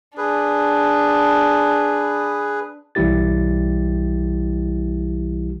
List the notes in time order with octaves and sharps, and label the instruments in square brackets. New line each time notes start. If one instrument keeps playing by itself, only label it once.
[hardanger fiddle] D4 [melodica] G#4 B4
[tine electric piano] B1 E3 G3 E4 G4 A6